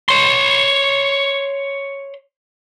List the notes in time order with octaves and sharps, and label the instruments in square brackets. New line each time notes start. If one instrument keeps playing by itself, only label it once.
[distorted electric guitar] C#5 C6